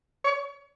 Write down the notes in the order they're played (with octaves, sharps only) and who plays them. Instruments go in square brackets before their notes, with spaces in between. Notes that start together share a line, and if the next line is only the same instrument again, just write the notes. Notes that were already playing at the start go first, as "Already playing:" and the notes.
[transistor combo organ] C#5